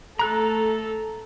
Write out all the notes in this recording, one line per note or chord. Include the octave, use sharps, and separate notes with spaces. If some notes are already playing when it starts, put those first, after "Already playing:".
A3 A4 A#5 F#6